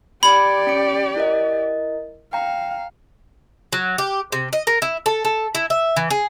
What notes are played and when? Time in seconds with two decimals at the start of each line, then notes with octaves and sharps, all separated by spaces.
0.23 G4 D5 B5 G#6 C#7
0.67 C#4 C#7 D7
1.16 E4 A#4 D#5
2.33 F5 G5 A#5
3.73 F#3
3.98 G4
4.32 C3
4.53 D#5
4.67 A#4
4.82 E4
5.06 A4
5.25 A4
5.55 E4
5.70 E5
5.97 E3
6.10 G#4